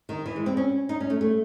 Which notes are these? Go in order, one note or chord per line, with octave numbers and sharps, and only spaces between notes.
D#3
E3
G#3
C4
C#4
D#4
C#4
A3
A3